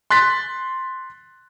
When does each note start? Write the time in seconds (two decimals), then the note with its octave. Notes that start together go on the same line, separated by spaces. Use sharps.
0.11 C6 F#6 A6 B6